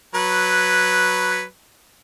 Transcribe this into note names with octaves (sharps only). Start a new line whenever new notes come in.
F#3 B4